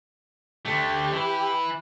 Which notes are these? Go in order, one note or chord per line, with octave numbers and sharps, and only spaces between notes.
D3 A3 G4
E3 B4